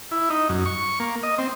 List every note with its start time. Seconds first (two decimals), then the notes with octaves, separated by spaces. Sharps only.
0.11 E4
0.30 D#4
0.49 F#2
0.66 C#6
1.00 A#3
1.23 D#5
1.38 C4